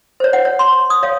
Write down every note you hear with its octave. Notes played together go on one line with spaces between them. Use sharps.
C5 C#5
F#5
C#5
C6
D#6
C#5 F5